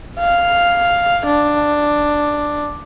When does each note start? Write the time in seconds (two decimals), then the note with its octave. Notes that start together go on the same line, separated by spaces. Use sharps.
0.19 F5
1.26 D4